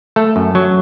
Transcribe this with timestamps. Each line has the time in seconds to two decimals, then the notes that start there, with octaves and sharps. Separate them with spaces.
0.16 A3 A4
0.36 F#2
0.55 F#3